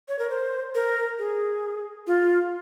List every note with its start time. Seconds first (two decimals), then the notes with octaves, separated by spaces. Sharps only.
0.08 C#5
0.19 A#4
0.30 C5
0.75 A#4
1.19 G#4
2.07 F4